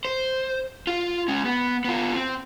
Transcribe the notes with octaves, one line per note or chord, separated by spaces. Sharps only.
C5
F4
G#3 C#4
B3
B3 F4
C4